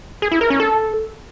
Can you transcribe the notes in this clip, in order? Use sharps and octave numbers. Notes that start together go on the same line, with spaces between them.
G#4
E4
A#4
C#4
A4